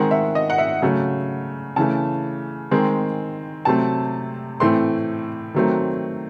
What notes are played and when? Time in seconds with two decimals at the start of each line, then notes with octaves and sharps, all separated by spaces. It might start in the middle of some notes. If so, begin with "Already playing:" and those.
Already playing: D#3 G#3 C4 F#5
0.11 E5
0.35 D#5
0.50 F#5
0.58 E5
0.82 C#3 F#3 A3
1.76 C#3 E3 A3 A5
2.71 D#3 G#3 C4
3.65 C3 F#3 A3 C4 A5
4.60 A2 E3 A3 C4 C6
5.54 D#3 F#3 A3 C4